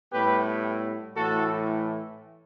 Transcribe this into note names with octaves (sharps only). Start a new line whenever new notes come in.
A2 G3 B3 G4 B4
A2 E3 A3 F#4 A4